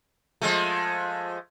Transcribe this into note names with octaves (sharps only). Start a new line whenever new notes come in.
F3 G#3 A3